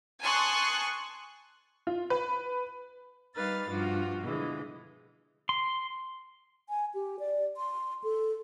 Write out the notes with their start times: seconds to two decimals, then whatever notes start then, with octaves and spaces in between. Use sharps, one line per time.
0.23 G#5 A5 C6 C#6 D#6 F#6
1.87 F4
2.10 B4
3.35 G3 D#4 B4 F5 A6
3.68 G2 F3 F4 F#4
4.21 B2 D3 E3 F3 G#3
5.49 C6
6.69 G#5
6.94 G4
7.20 D5
7.57 C6
8.04 A4